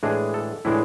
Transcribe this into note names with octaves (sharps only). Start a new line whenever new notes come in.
A2 E3 G#3 D4 G#4
A4
A2 E3 G#3 D4 E4